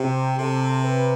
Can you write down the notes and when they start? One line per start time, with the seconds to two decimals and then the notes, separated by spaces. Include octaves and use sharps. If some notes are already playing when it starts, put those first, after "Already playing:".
Already playing: C3 G4
0.38 C3 A4
0.83 B4